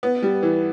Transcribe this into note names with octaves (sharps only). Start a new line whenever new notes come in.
B3
G3
E3